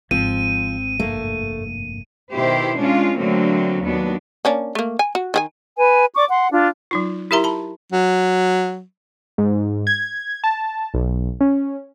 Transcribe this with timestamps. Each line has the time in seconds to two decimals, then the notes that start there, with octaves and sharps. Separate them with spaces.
0.11 G#1 F3 C4 D#7
1.00 F1 G2 A3 A#3
2.32 B2 D#3 E4 G4 C5
2.77 G#3 C#4 D4 F4
3.18 D3 F#3 A3 A#3 C4
3.81 D#2 F#3 B3 D4
4.45 A#3 C#4 D4
4.75 A3 A#3
4.99 G#5
5.15 F#4
5.34 D#3 G#4 G#5
5.78 B4 G#5
6.15 D5 C#6 D6
6.30 F#5 C6
6.53 D4 F4
6.91 F#3 D#4 F4
7.31 E4 G4 A#4 E5 A#5 C6
7.44 A5 B5
7.93 F#3
9.38 G#2
9.87 G#6
10.44 A5
10.94 B1
11.41 C#4